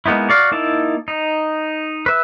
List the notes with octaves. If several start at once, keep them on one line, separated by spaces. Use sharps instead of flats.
G#3 A#3 B3 D#4 E4
F#4 D5 F5
A#3 D#4 E4 A5
D#4
B4 E5